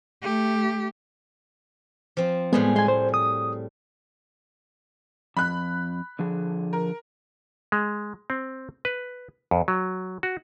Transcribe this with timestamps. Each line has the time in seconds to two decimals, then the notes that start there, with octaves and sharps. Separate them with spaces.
0.23 A3 G4
2.17 F3 C4
2.53 A2 G3 G#3 B3 G#4
2.76 G#3 G#5 C6
2.88 C5
3.14 D#6
5.37 F2 B5 F#6
6.19 D3 F3 G#4
6.73 A#4
7.72 G#3
8.30 C4
8.85 B4
9.51 F2
9.68 F#3
10.23 F#4